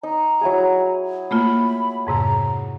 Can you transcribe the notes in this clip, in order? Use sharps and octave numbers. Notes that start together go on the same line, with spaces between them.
D#4 A#5
F#3 E4 G#4
A3 A#3 F4 B5
F2 G#2 C3 A#5